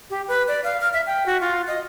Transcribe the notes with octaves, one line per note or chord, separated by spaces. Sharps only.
G4
B4
D5
F5
F6
E5
G5
F#4
F4
D#5